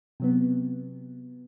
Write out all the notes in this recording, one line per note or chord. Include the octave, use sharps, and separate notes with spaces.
C3 F#3 B3